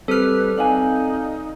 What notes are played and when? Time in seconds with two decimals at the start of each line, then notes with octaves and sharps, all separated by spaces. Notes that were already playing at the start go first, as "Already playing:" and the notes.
0.08 G3 C4 A4 B4 F6
0.57 D#4 D5 F5 G#5